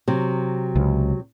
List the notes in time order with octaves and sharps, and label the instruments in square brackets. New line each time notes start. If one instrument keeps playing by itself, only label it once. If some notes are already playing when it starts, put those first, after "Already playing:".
[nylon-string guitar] C3 F#3
[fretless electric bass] C#2